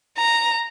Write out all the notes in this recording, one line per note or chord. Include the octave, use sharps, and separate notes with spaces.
A#5